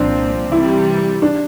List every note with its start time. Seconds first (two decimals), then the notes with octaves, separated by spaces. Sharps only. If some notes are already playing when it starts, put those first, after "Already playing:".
Already playing: C2 A#2 F3 C4 D4
0.52 C3 E3 G3 E4
1.22 D4